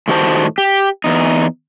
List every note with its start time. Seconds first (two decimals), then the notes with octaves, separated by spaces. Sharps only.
0.08 A2 D#3 G3 F#4 C5 A5
0.58 G4
1.04 E2 D#4